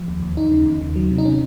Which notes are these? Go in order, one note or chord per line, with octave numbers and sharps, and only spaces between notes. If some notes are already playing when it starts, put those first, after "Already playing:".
Already playing: F3
D#2
D#2
D#2 D#4
C#3
D#2
D#3
F#3
C3
D#4
C3 C#4